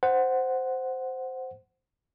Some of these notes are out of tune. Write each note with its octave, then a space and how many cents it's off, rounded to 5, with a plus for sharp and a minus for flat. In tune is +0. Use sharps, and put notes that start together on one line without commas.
C5 -5 F#5 +0